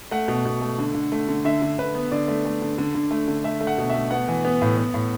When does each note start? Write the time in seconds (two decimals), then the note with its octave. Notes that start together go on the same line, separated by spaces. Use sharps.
0.11 A3 F#5
0.28 B2
0.45 B2
0.61 A3
0.79 D3
0.95 D3
1.12 A3
1.28 D3
1.45 D3 E5
1.62 D3
1.78 D3 B4
1.95 B3
2.11 D3 D5
2.28 A3
2.45 A3
2.62 D3
2.78 D3
2.95 D3
3.11 A3
3.28 D3
3.44 A3 E5
3.61 A3
3.67 F#5
3.78 B2
3.90 A3 E5
4.11 B3 F#5
4.28 E3
4.45 B3
4.62 A2
4.78 B3
4.94 A2